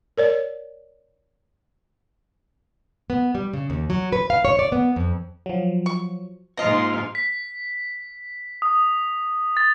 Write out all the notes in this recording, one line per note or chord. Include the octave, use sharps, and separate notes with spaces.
A#4 C#5 D5
B3
G3
C#3
D#2
F#3
B4
F5
C#5
D5
B3
F2
F3 F#3
C#6
G#2 F3 A#3 F4 D#5 A#6
B6
D#6
A6